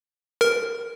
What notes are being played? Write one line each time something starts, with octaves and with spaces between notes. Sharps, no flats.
A#4